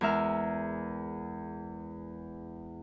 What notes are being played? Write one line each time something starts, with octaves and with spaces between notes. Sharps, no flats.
E2 G#3 A#4 E5 F6